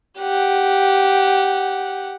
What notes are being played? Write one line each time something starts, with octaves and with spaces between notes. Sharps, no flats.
G4 F#5